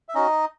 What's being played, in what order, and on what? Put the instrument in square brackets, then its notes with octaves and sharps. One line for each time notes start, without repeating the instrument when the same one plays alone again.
[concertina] E5
C#4 D#4 F#4 D#5